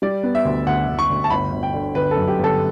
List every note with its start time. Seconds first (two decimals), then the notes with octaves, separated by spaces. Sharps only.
0.02 G3 D5
0.23 B3
0.35 E5
0.45 D2
0.67 D2 F#5
0.87 D2
0.99 C#6
1.10 D2
1.24 A5
1.30 G1 B5
1.52 G1
1.63 G5
1.74 D3
1.95 G1 B4
2.11 A4
2.16 F#2
2.28 G4
2.39 G1
2.44 A4